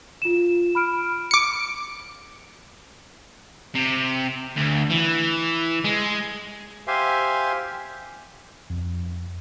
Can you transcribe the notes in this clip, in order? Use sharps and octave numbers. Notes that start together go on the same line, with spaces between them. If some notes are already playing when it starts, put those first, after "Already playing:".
F4 E7
B5 F6 D7
D6 C#7
C3
D2
E3
G#3
G4 C5 E5 F5 G#5 C6
F2